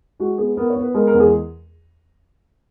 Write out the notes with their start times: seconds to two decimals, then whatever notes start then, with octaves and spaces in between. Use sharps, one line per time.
0.20 G#3 F#4
0.38 B3 G#4
0.57 B3 A#4
0.70 C#5
0.76 B3
0.83 B4
0.94 G#3 A#4
1.07 A#4
1.14 E2
1.20 G#4